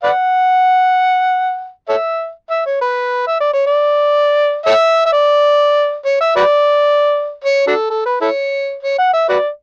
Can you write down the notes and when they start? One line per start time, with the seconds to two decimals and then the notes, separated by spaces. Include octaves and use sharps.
0.03 B4 D5 F#5
1.89 A4 C#5 E5
2.50 E5
2.66 C#5
2.81 B4
3.27 E5
3.40 D5
3.53 C#5
3.67 D5
4.66 A4 C#5 E5
5.06 E5
5.12 D5
6.05 C#5
6.21 E5
6.36 F#4 B4 D5
7.44 C#5
7.67 D4 F#4 A4
7.90 A4
8.06 B4
8.21 E4 A4 C#5
8.83 C#5
8.98 F#5
9.13 E5
9.29 F#4 B4 D5